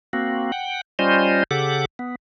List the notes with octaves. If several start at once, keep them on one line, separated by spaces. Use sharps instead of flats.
A#3 C4 F#4
F#5 G5
G3 C#4 F4 C5 D#5
C#3 G4 A4 F#5 D6
B3